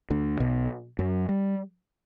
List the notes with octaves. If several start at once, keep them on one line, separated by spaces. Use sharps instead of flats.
D2 D3
B1 B2
F#2 F#3
G3